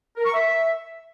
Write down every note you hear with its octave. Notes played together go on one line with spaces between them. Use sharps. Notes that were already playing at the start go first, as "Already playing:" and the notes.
A#4
C#6
E5